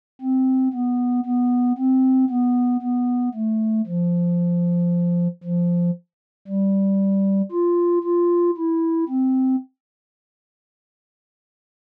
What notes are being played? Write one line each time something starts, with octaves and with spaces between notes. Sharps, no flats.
C4
B3
B3
C4
B3
B3
A3
F3
F3
G3
F4
F4
E4
C4